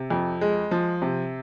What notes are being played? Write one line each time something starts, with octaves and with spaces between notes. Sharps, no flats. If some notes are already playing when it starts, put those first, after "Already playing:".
Already playing: C3
F2
G#3
F3
C3